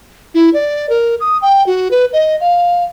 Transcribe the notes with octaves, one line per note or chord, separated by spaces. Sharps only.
E4
D5
A#4
D#6
G5
F#4
B4
D#5
F5